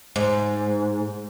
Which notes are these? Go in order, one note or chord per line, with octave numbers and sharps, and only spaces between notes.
G#2